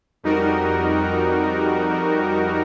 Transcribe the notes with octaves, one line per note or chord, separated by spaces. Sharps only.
F2 G3 D#4 F#4 A#4